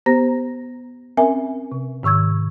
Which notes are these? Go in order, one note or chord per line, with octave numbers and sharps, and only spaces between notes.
B3 G4 C5 A#5 A#6
C4 C#4 A#4 E5 G#5
C3
G#2 D#3 C#6 E6 G#6